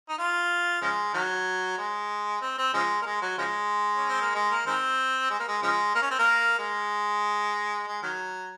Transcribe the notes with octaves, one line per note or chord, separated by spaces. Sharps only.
D#4
F4
C#3 F3 G#3
D#3 F#3
G#3
C4
C4
C#3 F3 G#3
A#3
G#3
F#3
C#3 F3 G#3
C#4
C4
A#3
G#3
A#3
D#3 G#3 C4
G#3
A#3
G#3
C#3 F3 G#3
A#3
C#4
C4
A#3
G#3
G#3
D#3 F#3